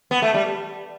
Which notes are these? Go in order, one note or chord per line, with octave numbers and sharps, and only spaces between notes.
B3
A3
G3